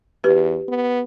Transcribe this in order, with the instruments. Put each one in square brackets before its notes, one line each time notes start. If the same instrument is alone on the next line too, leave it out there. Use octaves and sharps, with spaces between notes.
[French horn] E2 [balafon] G4 B4
[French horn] B3